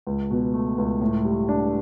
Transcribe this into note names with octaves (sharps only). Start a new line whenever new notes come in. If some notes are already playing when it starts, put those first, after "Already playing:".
C#2
B2
A3
C#2
A2
G3
D4